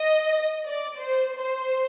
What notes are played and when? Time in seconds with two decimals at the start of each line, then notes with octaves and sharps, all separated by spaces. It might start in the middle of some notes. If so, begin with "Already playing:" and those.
Already playing: D#5
0.65 D5
1.00 C5
1.36 C5